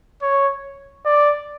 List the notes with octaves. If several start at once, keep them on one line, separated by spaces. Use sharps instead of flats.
C#5
D5